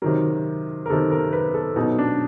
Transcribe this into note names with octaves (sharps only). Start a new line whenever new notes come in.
C3 D#3 F#3 A#4
A#4
C3 D#3 F#3 A4
A#4
B4
A4
B2 F#3 D#4
D4